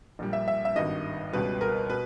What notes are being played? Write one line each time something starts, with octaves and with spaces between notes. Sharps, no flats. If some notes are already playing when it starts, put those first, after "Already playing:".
A#1 A#2 G3
E5
E5
E5
G#1 G2 D#3 D#5
C#2 B2 G3 B4
A#4
B2 B4